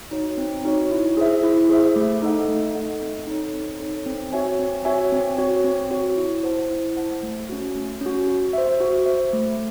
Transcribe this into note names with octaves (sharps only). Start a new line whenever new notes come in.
D#4 F#4 C#5
C4
D#4 F#4 C#5
E4
G#4 C5 E5
E4
G#4 C5 E5
A3
D#4 A4 D#5 F#5
A3
D#4 A4 D#5 F#5
C4
D#4 A4 C#5
C4
D#4 A4 C#5
C4
F#4 C#5 E5 G#5
C4
F#4 C#5 E5 G#5
C4
F#4 C#5
C4
F#4 C#5
E4
C5 F#5 A5
E4
C5 F#5 A5
A3
C#4 F#4
A3
C#4
F#4
F#4
C5 E5
F#4
C5 E5
A3